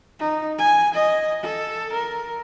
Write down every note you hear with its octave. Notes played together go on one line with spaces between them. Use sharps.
D#4
G#5
D#5
A4
A#4